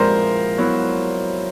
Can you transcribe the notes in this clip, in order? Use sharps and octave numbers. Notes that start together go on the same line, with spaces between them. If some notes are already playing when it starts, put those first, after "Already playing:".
Already playing: A#2 F3 G#3 C4 E4 A#4 C5 D5
F#3 B3 E4